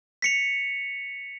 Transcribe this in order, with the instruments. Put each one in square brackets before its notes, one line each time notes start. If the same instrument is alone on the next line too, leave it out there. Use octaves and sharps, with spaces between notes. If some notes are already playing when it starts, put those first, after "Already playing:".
[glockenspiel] B6 C#7 F7